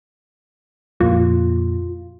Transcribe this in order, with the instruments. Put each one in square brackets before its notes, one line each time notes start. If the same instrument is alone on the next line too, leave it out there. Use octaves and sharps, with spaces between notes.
[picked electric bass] F2 A#2 A#3 [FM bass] F4